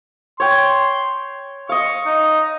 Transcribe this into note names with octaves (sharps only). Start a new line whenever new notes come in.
C#5 G5 C6
D#5 F5 C#6
D#4